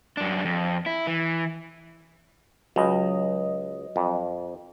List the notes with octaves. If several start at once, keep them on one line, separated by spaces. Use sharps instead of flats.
F#2 D4
F2
E4
E3
C#2 F#3 D#5
F2